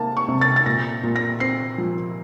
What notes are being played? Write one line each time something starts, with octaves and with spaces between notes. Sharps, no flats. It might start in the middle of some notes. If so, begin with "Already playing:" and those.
Already playing: C3 A#3 A5
C#6
C3
A6
A6
A#2 A#6
A#2
A#6
C4 C7
F3